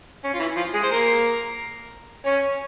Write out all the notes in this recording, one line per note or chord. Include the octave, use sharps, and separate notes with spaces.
C#4
F4
E3 E4
F3 F4
G#3 G#4
C5
A#3 A#4
C#4 C#5